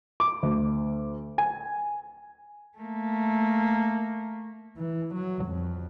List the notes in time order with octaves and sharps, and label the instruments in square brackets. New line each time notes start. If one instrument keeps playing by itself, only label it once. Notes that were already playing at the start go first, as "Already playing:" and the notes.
[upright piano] D6
D2
G#5
[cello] A3 A#3
[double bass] E3
F#3
F2